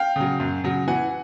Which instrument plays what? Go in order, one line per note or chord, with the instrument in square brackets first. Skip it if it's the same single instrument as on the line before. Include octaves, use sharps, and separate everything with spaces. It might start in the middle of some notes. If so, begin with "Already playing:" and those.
Already playing: [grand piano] F5 G5
C#3 F#3
F#2
C#3 F#3
E3 F#5 G#5